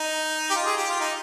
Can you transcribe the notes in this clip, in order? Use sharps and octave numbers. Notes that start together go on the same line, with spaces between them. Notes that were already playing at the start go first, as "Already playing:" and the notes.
Already playing: D#4
G4
F4
G#4
G4
F4
D#4